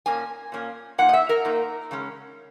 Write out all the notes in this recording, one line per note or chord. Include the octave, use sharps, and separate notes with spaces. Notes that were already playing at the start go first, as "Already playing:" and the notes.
A#2 A#3 C#4 G#5
A#2 A#3 C#4
A#2 A#3 D#4 F#5
D#5
E5
A#4
A#2 A#3 D#4
C#3 G#3 C#4